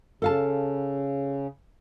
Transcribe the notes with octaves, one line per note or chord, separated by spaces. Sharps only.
C#3 A4 F5 A5